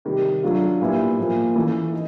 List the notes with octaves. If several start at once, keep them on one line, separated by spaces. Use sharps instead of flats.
C3 D#3 G3
F#3 A3 D4 F4
A#2 G3 B3 E4
A#2 F3 A#3
E3 A3 C#4 E4
D#4